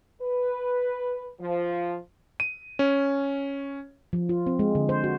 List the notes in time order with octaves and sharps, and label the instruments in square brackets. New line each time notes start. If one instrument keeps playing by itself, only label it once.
[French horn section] B4
F3
[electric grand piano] D#7
C#4
[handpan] F3
F4
C4
G#3
D3
C5
F#4